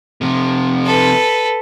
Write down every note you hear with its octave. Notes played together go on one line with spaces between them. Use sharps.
C3 F3
A4 B4